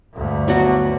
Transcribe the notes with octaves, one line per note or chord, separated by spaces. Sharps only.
D2 G2
F#3 B3 F#4